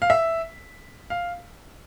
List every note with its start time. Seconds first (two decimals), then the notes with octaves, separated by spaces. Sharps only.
0.02 F5
0.10 E5
1.10 F5